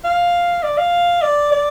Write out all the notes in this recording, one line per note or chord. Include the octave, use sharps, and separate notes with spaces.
F5
D5
F5
D5
D5